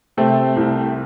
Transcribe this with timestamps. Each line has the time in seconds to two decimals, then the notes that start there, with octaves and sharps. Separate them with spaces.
0.17 C3 A3 C4
0.56 C2